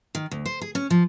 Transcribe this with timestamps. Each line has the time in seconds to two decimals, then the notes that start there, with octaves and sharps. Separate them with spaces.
0.15 D#3
0.31 D2
0.46 C5
0.61 G#4
0.75 C#4
0.90 F3